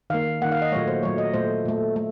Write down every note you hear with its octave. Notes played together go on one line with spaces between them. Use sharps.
D#3 A#3 F5
D#3 A#3 F#5
F5
D#5
A#2 F#3 A3 C#5
C5
A#2 F#3 A3 C#5
D#5
A#2 A3 C5
A#2 A3
A3